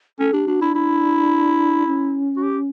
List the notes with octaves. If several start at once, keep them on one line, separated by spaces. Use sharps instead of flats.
C#4 A4
D4 G4
D4 F#4
D4 E4
E4
C#4
F#4
G4